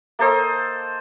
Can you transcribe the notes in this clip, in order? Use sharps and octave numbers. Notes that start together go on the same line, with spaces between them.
A#3 A4 C5 D#5